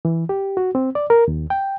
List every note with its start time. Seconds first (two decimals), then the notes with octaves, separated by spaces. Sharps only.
0.05 E3
0.29 G4
0.57 F#4
0.75 C4
0.95 D5
1.10 A#4
1.28 D#2
1.50 G5